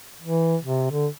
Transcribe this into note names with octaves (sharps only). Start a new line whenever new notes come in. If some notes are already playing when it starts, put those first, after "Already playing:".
E3
C3
D3